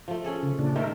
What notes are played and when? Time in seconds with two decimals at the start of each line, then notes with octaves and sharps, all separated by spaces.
0.08 F3 A3
0.24 C#4 G#4 A4
0.43 C#3
0.59 A#2 C#3 D4
0.75 D#3 A3 A#4 C5 E5